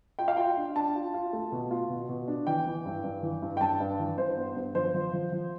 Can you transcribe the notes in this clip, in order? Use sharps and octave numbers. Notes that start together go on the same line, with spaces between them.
F4 G5
F5
F4 G5
D4
D4 A5
F4
F4
A3
B2
F4
B2
B2
D4
E3 G5
E3
G2
G2
E3
G2
G5
G2 A5
G2
E3
G2 C5
B3
G2
F3 C5
F3
F3
F3